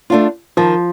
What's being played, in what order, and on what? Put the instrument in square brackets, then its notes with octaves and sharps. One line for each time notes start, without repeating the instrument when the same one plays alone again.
[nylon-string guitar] A3 D4 F4
[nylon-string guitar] D#3 [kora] F3